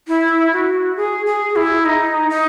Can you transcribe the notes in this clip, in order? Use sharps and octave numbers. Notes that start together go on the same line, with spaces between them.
E4
F#4
G#4
G#4
E4
D#4
D#4